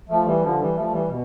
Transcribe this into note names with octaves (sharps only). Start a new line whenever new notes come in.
F3 A3
E3 G3
D3 F3
E3 G3
F3 A3
E3 G3
B2